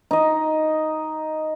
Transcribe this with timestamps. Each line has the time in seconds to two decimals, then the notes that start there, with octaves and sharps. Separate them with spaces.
0.11 D#4 D#5